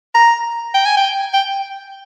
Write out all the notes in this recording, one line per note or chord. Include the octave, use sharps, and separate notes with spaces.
A#5
G5
G#5
G5
G5